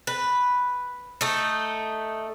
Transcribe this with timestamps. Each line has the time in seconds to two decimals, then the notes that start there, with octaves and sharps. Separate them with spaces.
0.07 B4
1.21 A3 D#4